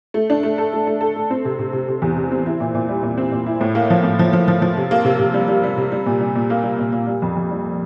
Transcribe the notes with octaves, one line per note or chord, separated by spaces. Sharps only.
A3
D4
A3
A4
A3
A3
A4
A3
C4
C3
C3
C3
C3
E2
C3
C4
E4
A#2
A#2
G3
A#2
C4
A#2
E4
A2
A#3
F3
A2
F3
F3
F3
F3
C3
A#3
C3
C3
G3
G3
G3
C3
G3
A#2
G3
A#2
A#3
G3
A#2
A#2
G3
F2
F2
G3